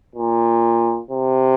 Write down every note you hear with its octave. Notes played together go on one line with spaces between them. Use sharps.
A#2
C3